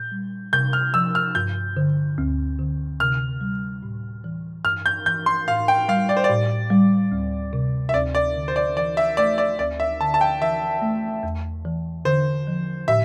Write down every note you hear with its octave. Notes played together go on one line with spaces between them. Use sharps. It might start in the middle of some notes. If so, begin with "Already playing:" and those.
Already playing: A#2 G6
G3
C3 G6
F6
F3 E6
F6
G2 G6
D3
D2
D3
C3 F6
G3
A2
E3
G2 F6
G6
E3 G6
C6
A2 F5
G5
G3 F5
D5
C5
D5
A2
G3
D2
C3
E5
D2 D5
D5
D3
C5
D5
E3 D5
E5
A3 D5
D5
D2 D5
E5
D3 A5
A5
G5
E3 E5
A3
E2
E3
D3 C5
F3
A2 E5